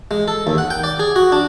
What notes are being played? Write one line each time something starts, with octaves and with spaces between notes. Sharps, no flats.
G#3
A4
D#2
F#5
G5
D5
G#4
F#4
D4